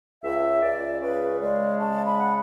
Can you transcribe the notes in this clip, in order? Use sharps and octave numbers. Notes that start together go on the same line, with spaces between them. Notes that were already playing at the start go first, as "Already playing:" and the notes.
C#2 E5
C#2 D5
C#3 B4
G#3 D5
C#3 A5
B5
F#5